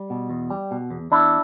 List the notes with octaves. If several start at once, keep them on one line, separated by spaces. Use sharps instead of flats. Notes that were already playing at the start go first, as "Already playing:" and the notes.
Already playing: G3
B2
E2
G3
B2
E2
E2 D4 E4